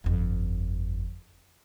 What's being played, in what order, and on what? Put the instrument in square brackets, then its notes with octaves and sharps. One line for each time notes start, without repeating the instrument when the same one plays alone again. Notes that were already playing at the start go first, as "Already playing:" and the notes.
[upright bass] G1 F2